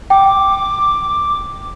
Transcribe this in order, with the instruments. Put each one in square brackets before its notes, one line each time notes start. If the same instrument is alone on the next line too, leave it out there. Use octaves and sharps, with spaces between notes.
[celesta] G5 [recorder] D6